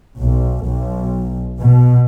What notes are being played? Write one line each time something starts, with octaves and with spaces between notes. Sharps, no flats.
B1
B1
B2